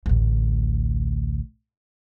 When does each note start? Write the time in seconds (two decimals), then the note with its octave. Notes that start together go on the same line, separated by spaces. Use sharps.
0.06 A1 D2